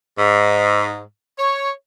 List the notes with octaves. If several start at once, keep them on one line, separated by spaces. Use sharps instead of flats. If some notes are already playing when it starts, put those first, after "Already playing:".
G#2
C#5